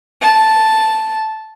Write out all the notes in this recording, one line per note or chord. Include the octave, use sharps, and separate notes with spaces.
A5